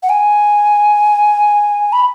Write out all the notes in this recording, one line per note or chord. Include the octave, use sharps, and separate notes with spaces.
F#5
G#5
B5